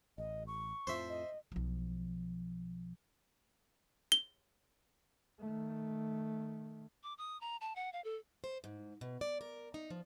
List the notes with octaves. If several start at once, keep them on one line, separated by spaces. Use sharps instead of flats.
A1 D#5
C#6
F2 A2 F3 C5 E5
D#5
B1 F3
G7
D#3 A3
D6
D#6
A#5
A5
F#5
F5
A4
C5
G#2
B2
D5
A#4
D#4
F3